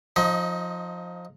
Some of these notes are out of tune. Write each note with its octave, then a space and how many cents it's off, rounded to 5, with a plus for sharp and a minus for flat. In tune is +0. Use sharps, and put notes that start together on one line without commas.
F3 +15 D#4 +0 D#5 +30